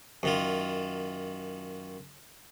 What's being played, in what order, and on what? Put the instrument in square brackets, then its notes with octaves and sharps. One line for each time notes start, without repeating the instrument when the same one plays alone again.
[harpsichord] F#2 D#3 F4